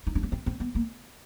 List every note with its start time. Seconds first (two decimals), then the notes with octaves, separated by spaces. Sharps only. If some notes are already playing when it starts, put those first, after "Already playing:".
0.07 D#4
0.15 D4
0.23 C#4
0.32 C4
0.46 C4
0.60 B3
0.75 A#3